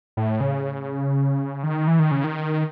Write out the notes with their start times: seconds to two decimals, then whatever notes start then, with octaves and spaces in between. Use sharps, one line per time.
0.17 A2
0.40 C#3
1.63 D#3
1.87 E3
1.99 D#3
2.11 C#3
2.24 D#3